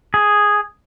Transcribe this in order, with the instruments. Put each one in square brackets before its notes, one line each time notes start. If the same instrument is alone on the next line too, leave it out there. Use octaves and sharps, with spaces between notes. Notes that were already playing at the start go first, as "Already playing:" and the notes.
[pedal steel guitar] G#4